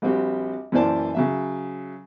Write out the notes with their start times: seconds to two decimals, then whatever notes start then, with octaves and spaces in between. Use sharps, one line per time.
0.02 A#1 G3 C4 F#4 G4
0.72 F#2 A#2 E3 C5 D5 A5
1.15 C#3 F#3 E5